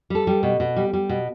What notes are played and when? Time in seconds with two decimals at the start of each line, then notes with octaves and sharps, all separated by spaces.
0.10 G3 A4
0.27 G3
0.43 B2
0.60 B2
0.76 G3
0.93 G3
1.09 B2